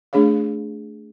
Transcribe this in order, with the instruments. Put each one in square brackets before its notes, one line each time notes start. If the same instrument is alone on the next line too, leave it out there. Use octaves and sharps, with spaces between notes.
[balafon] A3 D4 G#4 C#5 F5